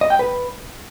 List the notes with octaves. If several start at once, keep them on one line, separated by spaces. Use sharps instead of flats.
D#5
G5
B4